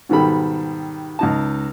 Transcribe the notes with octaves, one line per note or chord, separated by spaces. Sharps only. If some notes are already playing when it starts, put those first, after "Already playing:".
G#2 B2 D#3 G3 A4 B5
C#2 D#4 A5